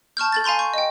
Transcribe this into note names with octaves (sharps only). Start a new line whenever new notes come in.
A5 C#6 F6 G6
A4 G6 A6
F5 G#5 A#5 C6 G6
C#6 G6
D#5 G5